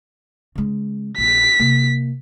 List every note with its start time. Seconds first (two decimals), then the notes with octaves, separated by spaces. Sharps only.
0.55 C#3 G#3
1.18 A#1 B6
1.59 C3 A#3